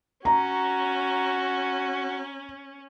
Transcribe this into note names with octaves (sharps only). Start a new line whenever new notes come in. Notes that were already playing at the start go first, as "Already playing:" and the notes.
C#4 F#4 A#5